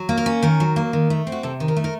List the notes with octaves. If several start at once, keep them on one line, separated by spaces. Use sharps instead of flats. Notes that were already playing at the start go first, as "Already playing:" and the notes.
Already playing: F#3
A#3
A#4
C#4
D#3 A#4
F#3
A#3
D#3
A3
C4
F#4
C3 A4
D#3
A#4
A3
A#4